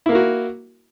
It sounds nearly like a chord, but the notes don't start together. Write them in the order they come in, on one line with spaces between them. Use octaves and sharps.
E4 A#3 A#4 F#4